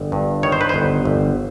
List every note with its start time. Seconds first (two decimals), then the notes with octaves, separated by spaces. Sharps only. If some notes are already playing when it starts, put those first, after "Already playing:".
Already playing: G1
0.12 G2
0.43 D#3 C#5
0.52 C5
0.61 B4
0.69 G1 C5
1.05 G1